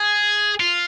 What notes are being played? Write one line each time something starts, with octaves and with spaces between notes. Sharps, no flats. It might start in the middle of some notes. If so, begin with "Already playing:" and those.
Already playing: G#4
F4